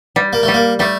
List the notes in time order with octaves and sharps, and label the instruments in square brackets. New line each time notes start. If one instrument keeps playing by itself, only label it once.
[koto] G3
[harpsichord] A#3
A3
[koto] G3
[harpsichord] A#3
[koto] G3 [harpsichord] A3